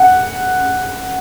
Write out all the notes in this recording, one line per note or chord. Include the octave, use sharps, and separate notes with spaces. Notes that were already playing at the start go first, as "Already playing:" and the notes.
Already playing: F#5